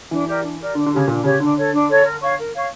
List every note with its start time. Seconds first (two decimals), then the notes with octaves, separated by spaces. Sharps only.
0.11 E3 D4
0.26 G4 A#4 D5
0.44 D4
0.59 G4 A#4 D5
0.75 D3 D4
0.86 D3
0.91 C#3 G4 C#5
1.07 A#2 D4
1.23 C#3 G4 C#5
1.40 D3 D4
1.56 A4 C#5
1.72 D4
1.88 A4 C#5
2.04 A#4
2.20 C#5 F5 C#6
2.37 A#4
2.52 C#5 F5 C#6